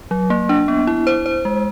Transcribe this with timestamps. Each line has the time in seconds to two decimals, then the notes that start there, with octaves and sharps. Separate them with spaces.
0.11 F#3
0.30 A#3
0.49 D4
0.68 B3
0.87 E4
1.07 C5
1.26 C5
1.45 G#3